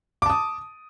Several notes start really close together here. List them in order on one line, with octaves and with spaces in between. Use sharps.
D6 A5 D#6